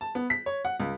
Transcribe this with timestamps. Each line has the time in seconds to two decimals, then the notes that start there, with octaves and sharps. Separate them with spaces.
0.01 A5
0.15 B3
0.30 B6
0.46 C#5
0.65 F#5
0.80 C#2